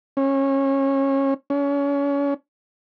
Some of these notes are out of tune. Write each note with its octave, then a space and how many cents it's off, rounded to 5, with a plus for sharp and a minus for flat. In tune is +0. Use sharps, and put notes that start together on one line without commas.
C#4 -25
C#4 +30